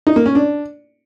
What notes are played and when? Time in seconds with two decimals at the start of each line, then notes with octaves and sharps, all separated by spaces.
0.07 D#4
0.16 A#3
0.26 C#4
0.35 D4